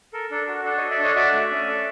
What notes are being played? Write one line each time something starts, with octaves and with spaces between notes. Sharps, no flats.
A4 A#4
D4 A4
F#4
D4 A4
C#5 D#5
A4
D5 E5
D4 C#5 D#5
F#4 D5 E5
A3
C#4
A4